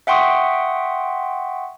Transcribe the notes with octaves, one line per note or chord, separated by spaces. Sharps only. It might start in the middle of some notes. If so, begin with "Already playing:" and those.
E5 F#5 G5 C6 C#6 D#6